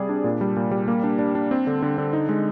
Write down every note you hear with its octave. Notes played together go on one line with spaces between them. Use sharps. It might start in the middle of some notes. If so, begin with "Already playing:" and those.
Already playing: C3 G3 G#4 D5
D4
A#2
G3
A#2
G3
A#3
D4
D4
D4
C4
D3
D3
D3
D#4
G#3